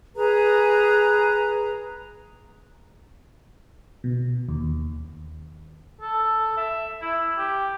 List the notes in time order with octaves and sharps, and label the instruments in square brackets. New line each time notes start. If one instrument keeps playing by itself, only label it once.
[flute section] G#4 B4 A#5
[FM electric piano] B2
D#2
[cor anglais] A4
E5
E4
G4